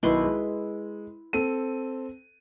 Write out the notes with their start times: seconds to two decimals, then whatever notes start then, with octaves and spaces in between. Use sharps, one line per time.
0.03 B1 D#3 E4 B4 C6
0.24 G#3
1.33 C4 A4 D#7